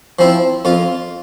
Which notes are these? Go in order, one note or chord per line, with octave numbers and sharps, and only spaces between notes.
F3 C4 E4
F2 F4